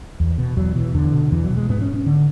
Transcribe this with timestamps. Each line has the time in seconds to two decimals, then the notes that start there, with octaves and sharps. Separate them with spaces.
0.20 E2
0.38 B2
0.56 E2 F#3
0.75 B2 E3
0.94 E2 D3
1.13 B2
1.32 E2 E3
1.44 F#3
1.50 B2
1.57 G#3
1.70 G#2 B3
1.81 C#4
1.94 C#4
2.06 D3